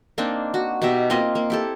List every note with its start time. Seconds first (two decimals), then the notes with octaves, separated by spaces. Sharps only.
0.18 A#3 C4 D4 D#4
0.54 F#4
0.82 B2 D#4 G4 E5
1.10 A#3 C4 F4 D#5
1.35 A#3
1.50 E4 G4 A4